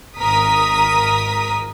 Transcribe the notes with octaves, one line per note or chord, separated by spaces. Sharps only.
G#1 A#4 D#6 B6